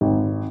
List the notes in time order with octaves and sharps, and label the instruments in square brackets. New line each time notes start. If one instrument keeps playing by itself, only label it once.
[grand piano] G#1